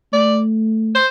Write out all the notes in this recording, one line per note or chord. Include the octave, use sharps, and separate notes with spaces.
A3 D5
C5